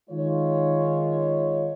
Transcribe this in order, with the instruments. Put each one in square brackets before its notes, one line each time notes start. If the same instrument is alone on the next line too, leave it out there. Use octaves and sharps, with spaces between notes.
[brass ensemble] D#3 G#3 F4 C#5